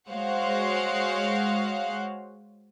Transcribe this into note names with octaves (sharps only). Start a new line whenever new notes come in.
G#3 F#4 C5 C#5 F5 F#5